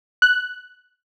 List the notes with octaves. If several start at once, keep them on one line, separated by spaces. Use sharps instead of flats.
F#6